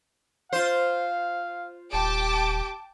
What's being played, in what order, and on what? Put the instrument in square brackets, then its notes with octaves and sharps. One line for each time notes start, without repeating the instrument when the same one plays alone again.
[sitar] F4 C5 [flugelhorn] F5
[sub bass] D#1 [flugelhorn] G4 [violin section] G5 A5 D6